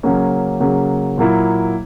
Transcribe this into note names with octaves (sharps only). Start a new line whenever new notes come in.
C#3 F#3 A#3 C#4
C#3 F#3 A#3 C#4
A#2 F#3 A#3 E4